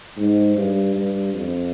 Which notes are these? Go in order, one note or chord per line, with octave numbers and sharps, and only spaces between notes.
G#2
G2
G2
F2